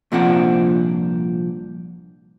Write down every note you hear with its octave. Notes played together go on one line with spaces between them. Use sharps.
C2 A#2 F3 C4 D4 F#5